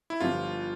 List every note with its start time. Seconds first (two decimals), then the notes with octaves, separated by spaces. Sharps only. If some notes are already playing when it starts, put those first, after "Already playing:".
0.10 E4
0.20 G1 G2 F3 F4